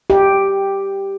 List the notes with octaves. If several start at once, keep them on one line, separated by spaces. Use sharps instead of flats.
G4